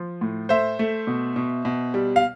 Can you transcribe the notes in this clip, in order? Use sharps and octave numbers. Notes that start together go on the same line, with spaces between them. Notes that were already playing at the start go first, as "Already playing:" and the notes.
Already playing: F3
A2
A3 C5 E5
A3
B2
B2
B2
G3
F5